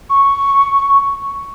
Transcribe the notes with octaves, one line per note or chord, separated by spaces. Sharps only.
C#6